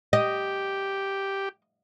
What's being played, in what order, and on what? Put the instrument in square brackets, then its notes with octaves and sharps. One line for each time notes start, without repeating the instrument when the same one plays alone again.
[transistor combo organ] G4 [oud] D#5